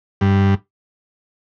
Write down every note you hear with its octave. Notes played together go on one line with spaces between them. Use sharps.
G2